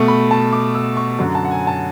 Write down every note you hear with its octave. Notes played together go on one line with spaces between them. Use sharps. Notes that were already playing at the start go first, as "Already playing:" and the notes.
Already playing: B2 A3 C#6
B5
A5
D6
E6
C#6
F#2 D3 F#3
A5
F#5
G#5
A5